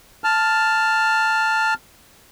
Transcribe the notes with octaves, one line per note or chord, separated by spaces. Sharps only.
A5 F6